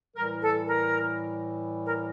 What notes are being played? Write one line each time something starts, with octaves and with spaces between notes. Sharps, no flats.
A2 E3 G3 A#4
A4
A#4
A#4